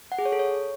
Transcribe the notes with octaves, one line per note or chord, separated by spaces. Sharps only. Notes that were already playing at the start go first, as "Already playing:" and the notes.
F#5
G#4
C#5
A4
C#5